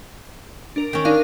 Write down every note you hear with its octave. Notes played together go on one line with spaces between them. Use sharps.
D4 A#4 D7
D#3 C#4
D4 D#4 D5 F5